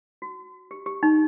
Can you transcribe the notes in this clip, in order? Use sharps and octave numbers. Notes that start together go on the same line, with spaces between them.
F#4
G4
G4
D#4